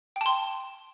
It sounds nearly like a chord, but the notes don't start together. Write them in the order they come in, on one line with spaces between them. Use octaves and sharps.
G5 A5 C6